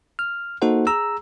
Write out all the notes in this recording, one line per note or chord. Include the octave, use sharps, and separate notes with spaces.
F6
A#3 D#4 F#4 A4 C5 F#5
G#4 A#5 E6